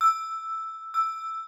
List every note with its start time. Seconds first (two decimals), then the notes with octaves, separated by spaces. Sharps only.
0.01 E6
0.94 E6